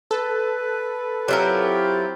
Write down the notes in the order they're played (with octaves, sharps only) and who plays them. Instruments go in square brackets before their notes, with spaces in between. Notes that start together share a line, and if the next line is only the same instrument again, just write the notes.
[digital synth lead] A4 [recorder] B4
[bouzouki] F#3 E4 A#4 [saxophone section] C4 F4 G4